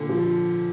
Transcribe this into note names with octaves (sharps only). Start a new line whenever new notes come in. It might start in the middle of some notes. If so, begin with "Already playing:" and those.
Already playing: A#2 D3
F3